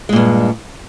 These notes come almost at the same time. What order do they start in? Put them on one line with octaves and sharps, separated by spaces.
G#3 A#2 G2